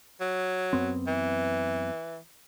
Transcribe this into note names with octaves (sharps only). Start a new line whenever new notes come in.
F#3
F#2 B3 C4
E3